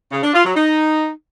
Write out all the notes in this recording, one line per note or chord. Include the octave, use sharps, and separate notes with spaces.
C#3
D4
F4
F#3
D#4